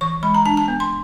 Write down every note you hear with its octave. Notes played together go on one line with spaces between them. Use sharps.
E3 C#6
G#3 B5
A#5
D4 A5
A5
B3
C6